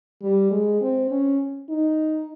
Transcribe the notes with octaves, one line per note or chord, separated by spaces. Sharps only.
G3
G#3
C4
C#4
D#4